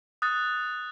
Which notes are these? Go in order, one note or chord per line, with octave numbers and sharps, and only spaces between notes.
D#6 F#6 A6